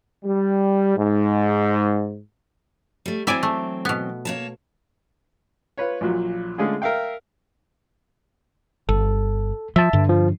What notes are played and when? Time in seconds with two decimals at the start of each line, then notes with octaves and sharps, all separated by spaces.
0.24 G3
0.96 G#2
3.06 G3 A3
3.27 E3 F#3 C4 E4 D5 G#5
3.43 A3
3.85 B2 B3
4.25 A#3 C#5 A5
5.78 F4 B4 C#5
6.01 A#1 A#2 F#3
6.58 D3 G#3 A3 C#4 F4 G#4
6.82 A#4 E5 F5 G5
8.89 G1 A4
9.76 F3 E5 A5
9.93 G2 D3
10.09 F3